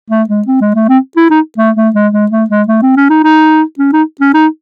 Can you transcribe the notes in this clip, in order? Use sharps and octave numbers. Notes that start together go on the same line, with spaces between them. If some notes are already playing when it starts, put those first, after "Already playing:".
A3
G#3
C4
G#3
A3
C4
E4
D#4
A3
A3
G#3
G#3
A3
G#3
A3
C4
C#4
D#4
D#4
C#4
D#4
C#4
D#4